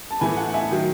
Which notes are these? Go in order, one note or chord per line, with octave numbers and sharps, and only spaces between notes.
A5
A2 E3 A3 G#5 B5
F#5 A5
E5 G#5
D#3 F#3